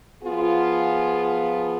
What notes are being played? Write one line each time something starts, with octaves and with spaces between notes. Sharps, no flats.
F3 B3 F4 G#4